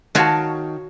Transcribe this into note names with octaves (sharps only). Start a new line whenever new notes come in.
D#3 F4 F#4 C#5 A5